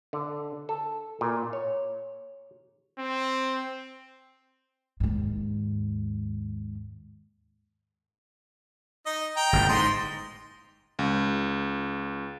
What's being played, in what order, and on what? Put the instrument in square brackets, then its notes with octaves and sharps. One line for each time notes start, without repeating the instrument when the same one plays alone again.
[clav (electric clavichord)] D3
A4
A#2
C#5
[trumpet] C4
[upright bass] D#2 G#2
[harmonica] D#4 D#5
G5 A#5
[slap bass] G1 A2
[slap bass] G#2 [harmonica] D#5 C6
[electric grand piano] C#2